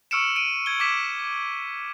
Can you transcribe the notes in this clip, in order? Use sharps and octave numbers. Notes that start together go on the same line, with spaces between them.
C#6 E6 F6 C#7 D7 E7
D7 D#7
G#6 G7
D6 G#6 B6 E7